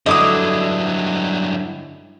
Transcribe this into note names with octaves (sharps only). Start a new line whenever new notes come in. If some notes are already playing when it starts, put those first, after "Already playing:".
G2 D3 F#3 E4 D#5 D6 D#6